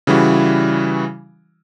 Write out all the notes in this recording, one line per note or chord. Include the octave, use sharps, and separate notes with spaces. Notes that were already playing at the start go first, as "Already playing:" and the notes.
C#3 E3 G3 E4 F#4